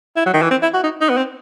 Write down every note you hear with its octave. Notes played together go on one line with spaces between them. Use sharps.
E4
F#3
D#3
E3
C4
E4
F#4
D#4
D#4
B3
C4